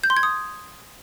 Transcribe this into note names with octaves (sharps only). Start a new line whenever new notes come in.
G6
C6
G#6
D#6